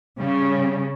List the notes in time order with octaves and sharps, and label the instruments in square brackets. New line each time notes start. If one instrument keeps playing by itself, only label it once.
[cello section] C#3 [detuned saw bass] G3